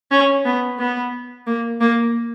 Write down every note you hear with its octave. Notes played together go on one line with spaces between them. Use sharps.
C#4
B3
B3
A#3
A#3